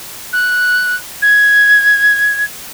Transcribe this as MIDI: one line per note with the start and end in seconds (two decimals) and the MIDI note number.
0.32 0.96 90
1.22 2.44 92